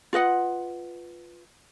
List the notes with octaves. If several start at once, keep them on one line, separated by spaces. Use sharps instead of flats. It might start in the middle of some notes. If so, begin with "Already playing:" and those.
F4 B4 D#5 F#5